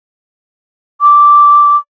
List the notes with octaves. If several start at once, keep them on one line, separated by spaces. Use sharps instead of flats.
D6